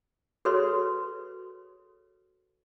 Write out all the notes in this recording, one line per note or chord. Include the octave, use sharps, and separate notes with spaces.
F#4 G#4 A4 B4 C#5 C6